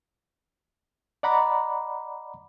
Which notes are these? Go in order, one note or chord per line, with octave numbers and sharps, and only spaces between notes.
D5 D#5 F#5 A#5 B5 D6